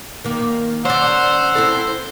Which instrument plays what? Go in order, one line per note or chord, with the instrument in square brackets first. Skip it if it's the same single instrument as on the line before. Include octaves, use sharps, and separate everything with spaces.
[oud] D#3 A#3
[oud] C#4 D5 [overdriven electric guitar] C5 [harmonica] F#5 E6
[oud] C4 E4 A4